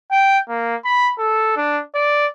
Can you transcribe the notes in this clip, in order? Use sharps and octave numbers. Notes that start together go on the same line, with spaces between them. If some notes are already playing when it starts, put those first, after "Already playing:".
G5
A#3
B5
A4
D4
D5